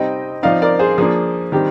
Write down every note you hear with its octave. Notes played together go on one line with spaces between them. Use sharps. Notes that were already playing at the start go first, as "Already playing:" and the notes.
Already playing: C3 G3 C4 D#4 D#5 G5
F3 C4 D#4 D5 F5
A#4 D5
G#4 C5
F3 A#3 D4 G#4
D#3 G3 C4 G4